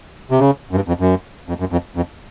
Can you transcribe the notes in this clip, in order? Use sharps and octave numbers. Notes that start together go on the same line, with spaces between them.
C3
C#3
F#2
G2
F2
F#2
F2
F#2
F2
F2